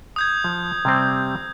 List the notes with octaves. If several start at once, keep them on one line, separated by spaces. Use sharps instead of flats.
D#6 G6 G#6
F3
C3 G3 C4